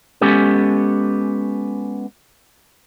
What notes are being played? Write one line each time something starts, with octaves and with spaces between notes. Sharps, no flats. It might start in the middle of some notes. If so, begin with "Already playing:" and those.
G#3 B3 C#4 G4 A4